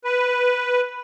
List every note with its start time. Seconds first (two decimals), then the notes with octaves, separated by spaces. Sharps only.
0.04 B4